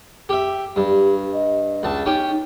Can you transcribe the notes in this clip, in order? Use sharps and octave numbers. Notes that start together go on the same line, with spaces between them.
G4 E5
G2 G4
D#5
C#2 A5
C#4 D#4 G4